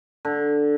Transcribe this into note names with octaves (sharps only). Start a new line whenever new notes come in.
D3